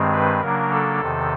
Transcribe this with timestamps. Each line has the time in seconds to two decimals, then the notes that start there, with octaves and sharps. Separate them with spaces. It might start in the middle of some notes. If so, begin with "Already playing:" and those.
Already playing: G2 D#3 G#3 C4
0.12 B4
0.41 C#3 F#3 A#3 D4 A#4
0.71 A4
1.00 E2 C3 D#3